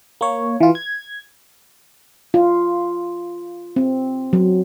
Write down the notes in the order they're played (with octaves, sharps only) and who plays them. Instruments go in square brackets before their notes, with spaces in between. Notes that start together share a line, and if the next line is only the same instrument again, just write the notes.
[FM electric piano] A#3 C#5
E3 F4
G#6
[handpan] F4
C4
F#3